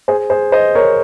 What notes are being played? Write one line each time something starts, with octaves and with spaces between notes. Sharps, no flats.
G#4 C5
G#4 C5
C5 D#5
A#4 C#5